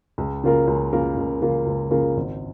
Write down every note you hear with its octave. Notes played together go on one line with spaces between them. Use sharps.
C#2
C#3 A#3 F4 A#4
C#2
C#3 A#3 F4 A#4
C#2
C#3 A#3 F4 A#4
C#2
C#3 A#3 F4 A#4
G#1